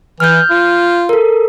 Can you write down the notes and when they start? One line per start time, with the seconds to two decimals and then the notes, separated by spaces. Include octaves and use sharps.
0.20 E3 F6 G6
0.50 F4
1.09 A4 A#4